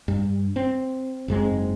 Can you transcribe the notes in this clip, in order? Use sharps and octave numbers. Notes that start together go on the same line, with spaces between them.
G2
C4
F#1 G#2 G#3 C4